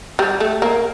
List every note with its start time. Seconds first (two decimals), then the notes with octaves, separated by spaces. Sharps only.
0.19 G3
0.40 A3
0.62 A#3